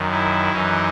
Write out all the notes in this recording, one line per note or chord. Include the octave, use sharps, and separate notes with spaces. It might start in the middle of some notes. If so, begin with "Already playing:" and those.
Already playing: F#2 D#3
E4
F#2 E3 D#4